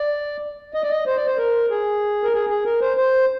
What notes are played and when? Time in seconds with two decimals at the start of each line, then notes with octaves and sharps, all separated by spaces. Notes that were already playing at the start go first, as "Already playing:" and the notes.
Already playing: D5
0.74 D#5
0.83 D5
0.90 D#5
1.07 C5
1.16 D5
1.27 C5
1.38 A#4
1.70 G#4
2.23 A#4
2.34 G#4
2.50 G#4
2.65 A#4
2.81 C5
2.97 C5